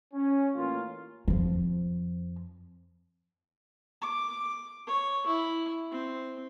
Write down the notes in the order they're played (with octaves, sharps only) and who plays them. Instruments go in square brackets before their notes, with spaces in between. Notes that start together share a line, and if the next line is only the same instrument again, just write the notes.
[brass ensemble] C#4
A1 A#3 C#4 F4
[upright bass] F2 F3
[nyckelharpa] D6
C#5
E4
C4